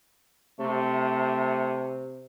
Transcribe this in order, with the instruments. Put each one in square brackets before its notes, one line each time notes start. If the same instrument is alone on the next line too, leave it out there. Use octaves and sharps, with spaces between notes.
[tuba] C3 [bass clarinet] A3